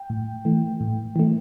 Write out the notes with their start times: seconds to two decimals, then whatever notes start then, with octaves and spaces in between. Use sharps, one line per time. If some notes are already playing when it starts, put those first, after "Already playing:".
Already playing: G5
0.10 A2
0.45 E3 A3
0.81 A2
1.16 E3 A3